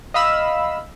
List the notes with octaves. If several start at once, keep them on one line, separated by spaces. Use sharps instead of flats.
D#5 F5 B5 E6